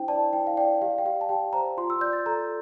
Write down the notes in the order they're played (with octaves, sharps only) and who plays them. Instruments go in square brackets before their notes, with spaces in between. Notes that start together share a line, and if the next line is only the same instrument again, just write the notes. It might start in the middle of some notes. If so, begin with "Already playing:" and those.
Already playing: [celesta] D4 E4 C5 G5
D5 A5
E4 G5
F5
D5 G5
G4 F5
G5
G4 F5
A5
G4 G5
C5 A#5
F4 C6
E6
D5 G6
A6
A4 A#5